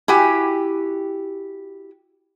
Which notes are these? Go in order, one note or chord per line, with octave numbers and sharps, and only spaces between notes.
E4 F#4 G4 G#5